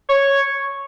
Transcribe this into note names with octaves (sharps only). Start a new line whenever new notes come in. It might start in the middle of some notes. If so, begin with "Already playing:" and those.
C#5